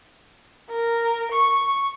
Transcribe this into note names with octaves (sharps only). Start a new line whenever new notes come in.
A#4
C#6